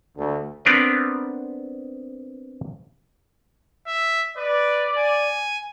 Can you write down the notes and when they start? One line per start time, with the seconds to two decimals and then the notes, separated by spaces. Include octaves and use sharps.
0.16 D2
0.65 B3 C4 D4 A#4 B4
3.87 E5
4.37 B4 D5
4.98 G#5